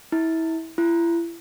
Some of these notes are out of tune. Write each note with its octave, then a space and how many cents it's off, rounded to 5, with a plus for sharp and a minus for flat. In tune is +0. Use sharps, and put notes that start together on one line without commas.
E4 -25
E4 +35